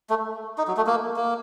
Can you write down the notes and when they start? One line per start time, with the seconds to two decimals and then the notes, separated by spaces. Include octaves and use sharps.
0.10 A3
0.58 D#4
0.68 F#3
0.77 A3
0.87 A#3
1.16 A#3